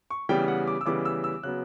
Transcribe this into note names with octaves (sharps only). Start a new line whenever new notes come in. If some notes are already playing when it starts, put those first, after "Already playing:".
C#6
C#3 E3 G3 B3 G5
F#5
D6
E6
C#3 E3 G3 B3 D6
E6
E6
C#3 F#3 B3 F#6